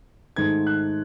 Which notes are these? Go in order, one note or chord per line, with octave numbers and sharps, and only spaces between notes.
G#2 D#3 A3 G#6
F#6